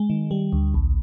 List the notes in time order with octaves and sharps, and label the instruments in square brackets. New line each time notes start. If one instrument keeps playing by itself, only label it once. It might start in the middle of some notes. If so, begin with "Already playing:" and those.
Already playing: [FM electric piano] G#3
D#3
G3
D2
A#1